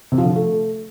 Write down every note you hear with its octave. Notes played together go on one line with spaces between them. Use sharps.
C3
F3
D3
F3
A3